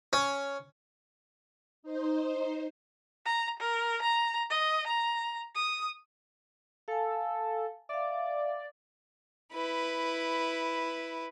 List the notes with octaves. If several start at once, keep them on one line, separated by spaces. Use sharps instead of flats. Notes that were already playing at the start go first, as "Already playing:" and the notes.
C#4
D#4 C5
A#5
A#4
A#5
D#5
A#5
D#6
A4 F5 G#5
D5 E5 F5
E4 B4